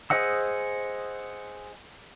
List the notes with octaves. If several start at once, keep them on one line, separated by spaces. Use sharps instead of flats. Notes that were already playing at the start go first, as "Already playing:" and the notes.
G#4 C5 D#5 F#5 E6